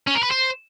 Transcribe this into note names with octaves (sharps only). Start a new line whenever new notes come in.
C#4
A#4
B4
C5